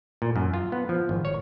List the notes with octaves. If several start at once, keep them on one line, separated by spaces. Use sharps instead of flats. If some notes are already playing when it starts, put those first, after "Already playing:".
A#2
F#2
F4
B3
F3
G#1
C#5